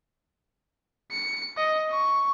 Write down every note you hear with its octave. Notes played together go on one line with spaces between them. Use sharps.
C#7
D#5
C#6